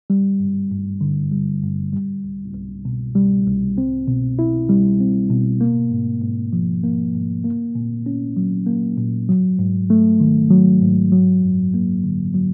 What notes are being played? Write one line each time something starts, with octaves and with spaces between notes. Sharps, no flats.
G3
G2
G2
D3
G3
G2
G3
C2
C2
B2
G3
C2
C4
B2
E4
G3
C4
B2
A#3
G#2
G#2
F3
A#3
G#2
A#3
A#2
C#4
F#3
A#3
A#2
F#3
G#2
A3
D#3
F#3
G#2
F#3
F#2
A#3
D3
F#3